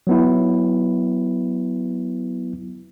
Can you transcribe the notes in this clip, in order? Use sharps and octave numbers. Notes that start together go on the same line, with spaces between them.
F#3 B3 E4